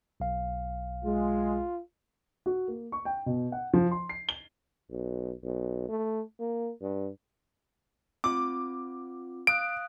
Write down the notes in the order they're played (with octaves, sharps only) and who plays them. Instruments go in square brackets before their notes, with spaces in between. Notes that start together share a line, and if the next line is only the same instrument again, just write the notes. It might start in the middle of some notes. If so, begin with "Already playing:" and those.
[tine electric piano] B1 F5
[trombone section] G#3 [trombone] F4
[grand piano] F#4
A#3
C#6
G5
B2
F#5
F3
C6
C7
G7
[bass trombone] B1
B1
A3
A#3
G2
[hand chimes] C4 F4 [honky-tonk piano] D6
[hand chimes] F5 D#6 F#6 [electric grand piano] D7